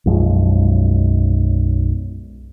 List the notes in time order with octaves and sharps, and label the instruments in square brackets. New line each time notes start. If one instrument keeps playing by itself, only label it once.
[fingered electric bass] B1 F#2 F3 G#3